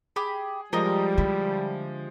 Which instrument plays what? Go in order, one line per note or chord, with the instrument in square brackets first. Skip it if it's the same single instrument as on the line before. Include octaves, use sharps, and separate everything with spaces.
[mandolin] G4 B5 [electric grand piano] G#4
[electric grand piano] F3 G#3 G4 [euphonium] G3 [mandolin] A#4 D#5
[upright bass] D3 [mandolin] E4